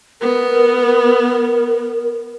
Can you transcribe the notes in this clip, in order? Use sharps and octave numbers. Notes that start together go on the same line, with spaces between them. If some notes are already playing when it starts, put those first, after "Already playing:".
B3 A#4